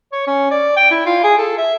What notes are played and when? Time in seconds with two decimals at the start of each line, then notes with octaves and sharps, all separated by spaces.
0.12 C#5
0.27 C#4
0.51 D5
0.77 G5
0.91 E4
1.06 F4
1.24 G#4
1.38 A4
1.58 E5